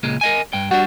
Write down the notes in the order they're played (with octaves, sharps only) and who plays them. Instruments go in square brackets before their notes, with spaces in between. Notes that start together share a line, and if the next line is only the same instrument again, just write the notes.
[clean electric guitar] C#2 A#2 G#3
A#4 D#5 G#5
G2 G5
[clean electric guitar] G3 D4 [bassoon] F#4